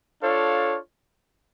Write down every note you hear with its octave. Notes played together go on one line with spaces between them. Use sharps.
D4 F4 A4 C#5 F5